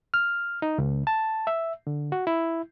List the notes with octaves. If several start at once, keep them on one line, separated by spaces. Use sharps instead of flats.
F6
D#4
C#2
A5
E5
D3
F#4
E4